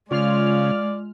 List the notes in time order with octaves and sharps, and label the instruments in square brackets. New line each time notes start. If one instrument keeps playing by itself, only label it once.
[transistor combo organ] C#3 [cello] G#3 [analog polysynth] F4 F6 [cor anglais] D5